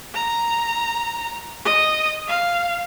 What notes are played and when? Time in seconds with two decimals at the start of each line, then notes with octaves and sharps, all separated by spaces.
0.14 A#5
1.65 D#5
2.27 F5